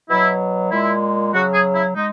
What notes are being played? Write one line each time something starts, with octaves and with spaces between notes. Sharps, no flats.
B2 F#3 E4
A#2 G#3 E4
C#3 F#3 F#4
G#4
E4
G#3 D#4